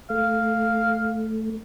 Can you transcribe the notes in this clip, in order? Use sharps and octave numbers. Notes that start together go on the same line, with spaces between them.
A3 F5